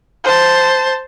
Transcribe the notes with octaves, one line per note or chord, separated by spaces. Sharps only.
C5 A5